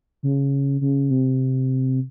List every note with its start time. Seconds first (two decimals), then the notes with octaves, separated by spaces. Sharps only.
0.23 C#3
0.81 C#3
1.10 C3